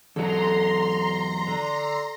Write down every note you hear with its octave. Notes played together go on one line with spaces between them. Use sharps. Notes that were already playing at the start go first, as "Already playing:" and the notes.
E2 F#3 A4 A#5 C6
D3